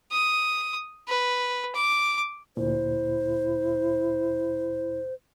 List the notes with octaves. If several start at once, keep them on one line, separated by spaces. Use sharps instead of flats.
D#6
B4
D6
D2 A#2 E4 C5